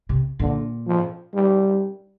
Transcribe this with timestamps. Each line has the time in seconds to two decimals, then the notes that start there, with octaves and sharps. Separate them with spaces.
0.09 C3
0.39 A#2 D3
0.87 F3
1.34 G3